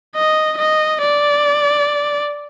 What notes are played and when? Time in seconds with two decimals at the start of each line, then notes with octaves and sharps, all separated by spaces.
0.16 D#5
0.58 D#5
1.02 D5